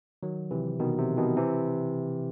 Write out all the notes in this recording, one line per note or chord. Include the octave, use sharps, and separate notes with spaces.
D#3 F#3
C3 E3
B2 D#3
C3
B2 D#3
C3 E3